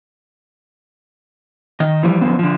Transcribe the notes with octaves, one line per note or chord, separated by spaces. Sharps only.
D#3 D#5
E3 F3 G3
F#2 A#2 D3 F3 B3 C4
D3 F3